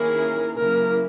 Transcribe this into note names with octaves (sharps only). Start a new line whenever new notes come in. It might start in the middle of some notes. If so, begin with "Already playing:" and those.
Already playing: D#3 A#3 C#4 E4 G#4 A#4
C#3 F#3 A#3 E4 A#4